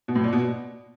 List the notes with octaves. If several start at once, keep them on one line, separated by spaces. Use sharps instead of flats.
B2
A2
A#2
B2